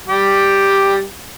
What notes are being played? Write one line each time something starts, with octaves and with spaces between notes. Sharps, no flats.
G3 G4